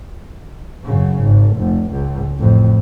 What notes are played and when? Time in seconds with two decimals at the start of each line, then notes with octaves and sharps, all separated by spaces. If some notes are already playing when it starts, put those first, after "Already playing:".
0.84 F#2 C#3
1.21 G#1
1.56 F1
1.91 C#2
2.37 A1 F2